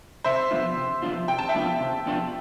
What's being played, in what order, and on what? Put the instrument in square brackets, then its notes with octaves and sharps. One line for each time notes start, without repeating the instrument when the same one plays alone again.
[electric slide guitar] C3 [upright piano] C5 E5
[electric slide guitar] F3 B3 D4 F4
C3
F3 B3 D4 F4
[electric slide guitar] C3 [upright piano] G5
[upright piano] A5
E5 G5
[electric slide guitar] F3 B3 D4 F4
C3
F3 B3 D4 F4